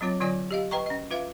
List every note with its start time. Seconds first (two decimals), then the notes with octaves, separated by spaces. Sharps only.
0.01 F#3 C4 F4 C#5
0.20 D3 F#3 F4 C#5 D5 G#5
0.51 G4 D#5 F5
0.71 B4 D#5 G5 A#5 C#6
0.86 C#4 D#5
1.11 F4 B4 E5 F5